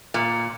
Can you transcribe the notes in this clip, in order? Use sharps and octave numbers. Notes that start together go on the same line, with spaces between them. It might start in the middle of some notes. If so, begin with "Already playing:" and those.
A#2